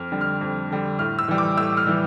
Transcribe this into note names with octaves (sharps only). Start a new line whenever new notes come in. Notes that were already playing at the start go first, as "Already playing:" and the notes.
Already playing: F2 F6
D3 G3
F6
F2
D3 G3
A2 F6
E6
E3 G3
D6
A2 E6
F6
E3 G3